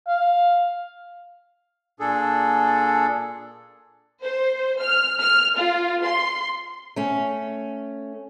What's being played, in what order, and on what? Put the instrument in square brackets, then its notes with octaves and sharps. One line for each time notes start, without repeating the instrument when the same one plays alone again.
[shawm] F5
[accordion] A#2 D4 G#4 A4
[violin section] C5
F6
F6
F4
C6
[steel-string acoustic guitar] A3 C#4